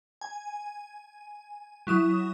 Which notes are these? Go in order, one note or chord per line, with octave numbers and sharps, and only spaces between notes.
G#5
F#3 E4 D#6 E7